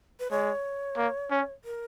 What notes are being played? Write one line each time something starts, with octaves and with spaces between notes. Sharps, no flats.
B4
G#3 C#5
A#3
C#4
A#4